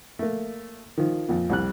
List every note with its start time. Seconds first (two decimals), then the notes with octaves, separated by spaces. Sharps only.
0.19 A3 A#3
0.98 D#3 F3
1.29 F2 A#2
1.50 C2 G3 F#6